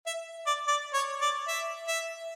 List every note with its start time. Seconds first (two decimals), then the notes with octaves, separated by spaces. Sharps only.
0.07 E5
0.47 D5
0.68 D5
0.94 C#5
1.21 D5
1.48 E5
1.88 E5